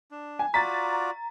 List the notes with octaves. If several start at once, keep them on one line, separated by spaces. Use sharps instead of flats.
D4
G#5
F4 F#4 D5 A#5 A6 B6